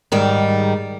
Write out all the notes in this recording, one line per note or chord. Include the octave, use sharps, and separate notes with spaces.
G#2 D#3 G3